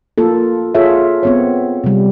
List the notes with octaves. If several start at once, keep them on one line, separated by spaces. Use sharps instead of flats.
A#3 F4 A4
F4 G#4 A4 C#5 E5
B3 C4 C#5
C3 G3